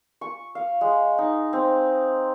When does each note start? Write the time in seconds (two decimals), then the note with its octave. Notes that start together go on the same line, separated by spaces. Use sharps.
0.21 C#6
0.55 F5
0.81 G#3
1.18 D#4
1.53 C4